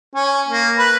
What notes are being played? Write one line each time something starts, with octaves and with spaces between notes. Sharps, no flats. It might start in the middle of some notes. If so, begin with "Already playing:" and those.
C#4
A#3
B4